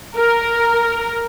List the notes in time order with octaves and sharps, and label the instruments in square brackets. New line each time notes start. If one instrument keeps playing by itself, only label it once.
[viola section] A#4